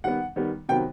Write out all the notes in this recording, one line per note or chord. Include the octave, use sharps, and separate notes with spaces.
D#3 G3 B3 F#5
D#3 G3 B3
C3 D#3 F#3 B3 G5